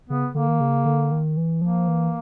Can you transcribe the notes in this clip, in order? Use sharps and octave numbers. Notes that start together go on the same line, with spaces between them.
C#3 B3
D3 A#3
D#3
C#3
D3
D#3
E3
F3 A#3
E3